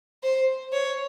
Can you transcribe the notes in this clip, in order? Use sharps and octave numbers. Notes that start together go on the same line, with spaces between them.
C5
C#5